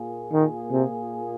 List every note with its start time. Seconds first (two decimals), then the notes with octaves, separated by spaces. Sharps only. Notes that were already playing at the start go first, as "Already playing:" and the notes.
Already playing: A#2 A#3 F4 G#4
0.33 D#3
0.71 C3